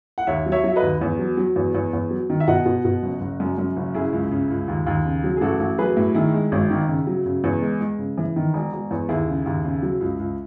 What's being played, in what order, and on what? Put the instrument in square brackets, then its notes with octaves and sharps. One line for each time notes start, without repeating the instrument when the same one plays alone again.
[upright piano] F#5
D#2 C#5 E5
F#3
C#5 E5
F#3 E5
B4 D#5
D#2
E2
F#3
F#3
E2
E2
E2
F#3
D#3
E5
B2 D#5 F#5
B2
B2
F#1
F#1
F#2
F#2
F#1
C#3 E4 G#4
C#2
C#3
C#2
D#2
D#2
C#3
F#3
G#4
A1 F#4 A4
A1
F#3 G#4 B4
A2
D#3 E4 G#4
G#3
G#1
D#3
C#3
F#3
C#3
E2
G#3
G#3
C#3
E3
D#3
E1
E1
E2
D#2 E4 G#4
C#3
D#2
C#3
F#3
C#2
C#2